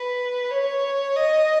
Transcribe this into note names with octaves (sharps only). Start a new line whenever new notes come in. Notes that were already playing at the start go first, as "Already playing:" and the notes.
Already playing: B4
C#5
D#5